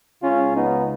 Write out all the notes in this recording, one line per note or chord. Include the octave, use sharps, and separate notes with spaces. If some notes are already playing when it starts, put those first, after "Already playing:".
C#2 C#3 C#4 F4
B3 D#4